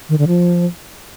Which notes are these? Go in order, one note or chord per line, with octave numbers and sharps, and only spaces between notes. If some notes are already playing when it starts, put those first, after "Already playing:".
D#3
D3
F3